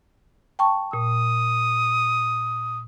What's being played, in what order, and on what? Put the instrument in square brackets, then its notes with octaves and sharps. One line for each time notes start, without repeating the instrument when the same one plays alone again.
[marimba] G5 A5 C#6
[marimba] A#2 [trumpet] D#6